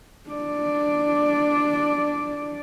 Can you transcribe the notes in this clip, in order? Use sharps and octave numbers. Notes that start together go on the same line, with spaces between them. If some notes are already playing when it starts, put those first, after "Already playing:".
D4 D5